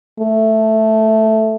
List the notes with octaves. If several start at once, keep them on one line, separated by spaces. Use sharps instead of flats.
A3